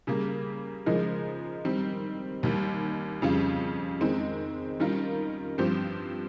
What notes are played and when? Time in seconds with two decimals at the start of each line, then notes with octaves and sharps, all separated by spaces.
0.07 C#3 G3 A#3
0.86 C#3 F3 G#3 D#4 A#4
1.65 D#3 G3 C4
2.43 D#2 D#3 G3
3.22 F2 C#3 G3 C#4 F4
4.01 D#3 G#3 C4
4.80 D#3 G3 C#4 F4 A#4
5.58 G2 F3 C4 G4 C5